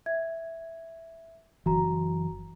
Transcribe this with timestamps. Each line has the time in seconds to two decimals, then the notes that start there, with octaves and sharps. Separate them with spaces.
0.06 E5 G#6
1.66 F#1 E3 F#4 A#5